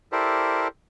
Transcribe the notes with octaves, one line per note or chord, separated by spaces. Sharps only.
E4 G4 A4 A#4 C5 D5